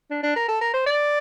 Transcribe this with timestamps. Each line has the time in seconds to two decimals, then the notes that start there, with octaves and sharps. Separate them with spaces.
0.11 D4
0.23 D4
0.36 A#4
0.48 A4
0.61 A#4
0.74 C5
0.86 D5